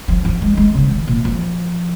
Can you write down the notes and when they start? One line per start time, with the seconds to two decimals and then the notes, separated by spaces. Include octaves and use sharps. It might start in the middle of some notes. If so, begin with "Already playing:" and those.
0.08 F3
0.25 F3
0.42 G#3
0.57 G#3
0.75 C#3
0.91 D#3
1.07 A#2
1.25 F3